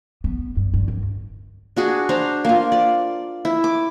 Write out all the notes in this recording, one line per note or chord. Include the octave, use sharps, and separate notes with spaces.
B3
G2
G2
F#2
D4 F#4 G#4
D4 C5 A#5
A#3 F4
D5
E4
D6